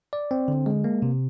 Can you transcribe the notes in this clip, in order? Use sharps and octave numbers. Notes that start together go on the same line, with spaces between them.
D5
C4
D3
G#3
A#3
C3